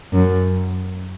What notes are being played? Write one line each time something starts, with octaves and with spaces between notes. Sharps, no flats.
F#2